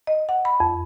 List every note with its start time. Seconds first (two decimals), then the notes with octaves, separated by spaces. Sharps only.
0.07 D#5
0.29 F#5
0.45 B5
0.60 F2